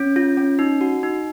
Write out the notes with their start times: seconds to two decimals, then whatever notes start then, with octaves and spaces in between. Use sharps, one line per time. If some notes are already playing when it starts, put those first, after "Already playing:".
Already playing: C#4
0.16 F4
0.37 C#4
0.59 D#4
0.81 F#4
1.03 D#4